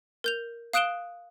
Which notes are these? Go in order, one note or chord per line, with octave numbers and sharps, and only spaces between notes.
A#4 G6 F7
F5 D#6 F#6 D7 E7 G7